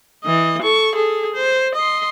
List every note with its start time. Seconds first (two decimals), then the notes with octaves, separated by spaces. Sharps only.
0.24 E3 D#5
0.62 A4 C#6
0.95 G#4 A4
1.34 C5
1.75 D#5 C6